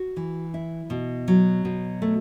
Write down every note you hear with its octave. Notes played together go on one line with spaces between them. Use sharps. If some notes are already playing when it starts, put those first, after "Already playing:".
Already playing: F#4
E3
E4
B2
F#3
B2
A3